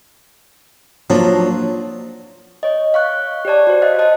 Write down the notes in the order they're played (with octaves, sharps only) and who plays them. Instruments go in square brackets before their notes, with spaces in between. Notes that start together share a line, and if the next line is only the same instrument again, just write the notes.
[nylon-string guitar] F3 F#3 D4 [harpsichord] A#3
[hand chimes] C#5 D#5
F5 C#6 F#6
G4 C#5 D5 A5
F#4 C5
D#5 F5 F#6
D#5 A5